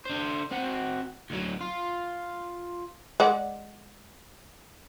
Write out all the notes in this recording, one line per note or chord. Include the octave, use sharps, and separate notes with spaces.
D3 C5
C4 F#4
D2 F#3
F4
G#3 D5 F#5